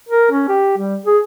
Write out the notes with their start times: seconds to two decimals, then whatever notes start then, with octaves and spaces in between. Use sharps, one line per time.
0.09 A#4
0.31 C#4
0.49 G4
0.78 G3
1.05 G#4